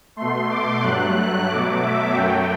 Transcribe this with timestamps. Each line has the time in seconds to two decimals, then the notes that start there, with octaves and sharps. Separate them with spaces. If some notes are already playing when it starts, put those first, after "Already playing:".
0.16 B2 A3 C6
0.50 D6
0.82 G2 F#3 A3 F#6
1.48 B2 F#3 A3 D6
1.81 E5
2.13 F#2 F#3 A3 G5